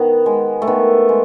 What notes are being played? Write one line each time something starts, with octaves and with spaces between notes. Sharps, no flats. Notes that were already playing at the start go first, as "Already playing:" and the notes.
Already playing: D#3 B3
G#3
A3
D#3 B3
G#3